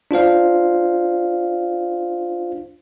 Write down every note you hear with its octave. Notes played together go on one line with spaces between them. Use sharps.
D4 F4 C5 F5